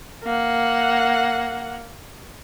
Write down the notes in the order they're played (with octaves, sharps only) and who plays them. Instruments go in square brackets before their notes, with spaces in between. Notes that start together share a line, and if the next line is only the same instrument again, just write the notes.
[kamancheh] A#3 F#5